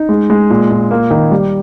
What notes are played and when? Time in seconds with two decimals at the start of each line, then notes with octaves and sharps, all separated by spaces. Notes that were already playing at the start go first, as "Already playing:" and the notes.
Already playing: D#4
0.09 G#3
0.30 G#3
0.50 A#2
0.71 A#2
0.91 A#3
1.11 D#3
1.31 G3